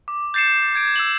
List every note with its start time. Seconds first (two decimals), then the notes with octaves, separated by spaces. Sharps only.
0.08 D6
0.34 G6 A6 C7 C#7 E7
0.75 G#6 D7
0.96 E6 E7 F#7